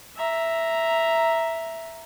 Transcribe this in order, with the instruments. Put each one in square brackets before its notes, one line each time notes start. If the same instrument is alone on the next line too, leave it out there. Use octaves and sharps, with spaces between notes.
[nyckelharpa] E5 A#5